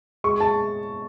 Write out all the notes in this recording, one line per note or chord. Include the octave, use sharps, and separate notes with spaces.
G#3 C#6
A5